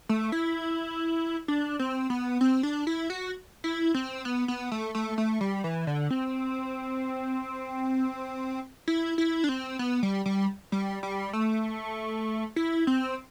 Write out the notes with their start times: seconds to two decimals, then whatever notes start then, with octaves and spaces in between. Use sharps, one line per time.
0.09 A3
0.32 E4
1.48 D4
1.79 C4
2.10 B3
2.41 C4
2.63 D4
2.87 E4
3.10 F#4
3.64 E4
3.94 C4
4.25 B3
4.48 B3
4.72 A3
4.95 A3
5.18 A3
5.41 G3
5.64 E3
5.87 D3
6.10 C4
8.88 E4
9.18 E4
9.44 D4
9.49 C4
9.79 B3
10.03 G3
10.26 G3
10.72 G3
11.03 G3
11.33 A3
12.56 E4
12.87 C4